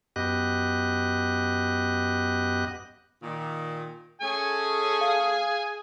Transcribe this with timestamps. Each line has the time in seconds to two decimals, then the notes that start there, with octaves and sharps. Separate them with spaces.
0.16 F#2 B3 G4 D#5 F#6
3.22 A#2 D#3
4.22 A3 C#4 G#4 G#5
5.01 F5